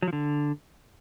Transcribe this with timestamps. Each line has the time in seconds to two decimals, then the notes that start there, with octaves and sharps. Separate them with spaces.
0.02 F#3
0.08 F3
0.13 D3